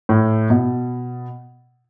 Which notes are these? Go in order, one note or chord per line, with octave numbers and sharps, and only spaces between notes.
A2
B2